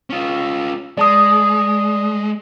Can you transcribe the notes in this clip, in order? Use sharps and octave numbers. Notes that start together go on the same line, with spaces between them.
C#4 F4
G#3 D5 A5 D#6